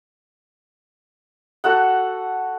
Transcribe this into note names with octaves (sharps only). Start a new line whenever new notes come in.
F#4 A4 F#5